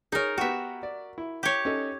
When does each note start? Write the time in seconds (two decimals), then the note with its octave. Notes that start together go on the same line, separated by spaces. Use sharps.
0.12 D#4 G#4 A#4 C#5
0.38 B3 F#4 G4 E5
0.83 D5
1.18 E4
1.43 G4 C#5
1.65 C#4 D#4 A4